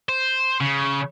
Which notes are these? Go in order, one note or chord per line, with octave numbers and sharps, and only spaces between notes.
C5
C#3